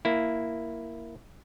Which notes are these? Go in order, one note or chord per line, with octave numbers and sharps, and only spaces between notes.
A#3 E4